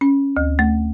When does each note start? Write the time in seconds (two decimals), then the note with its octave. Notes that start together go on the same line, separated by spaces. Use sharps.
0.01 C#4
0.37 D2
0.59 A3